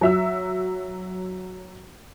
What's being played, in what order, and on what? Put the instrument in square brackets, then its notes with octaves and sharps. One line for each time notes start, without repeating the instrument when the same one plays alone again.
[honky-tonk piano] F#3 E5 E6